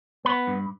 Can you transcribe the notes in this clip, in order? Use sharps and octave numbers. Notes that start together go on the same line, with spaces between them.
B3 B5
G2